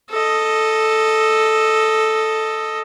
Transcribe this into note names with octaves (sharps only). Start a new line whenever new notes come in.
A4 D#5